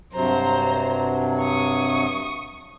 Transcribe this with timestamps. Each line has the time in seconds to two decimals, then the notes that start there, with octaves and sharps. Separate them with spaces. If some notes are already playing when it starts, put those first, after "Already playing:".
0.13 G2 C3 F#3 C5 A#5
1.40 C#6 D#6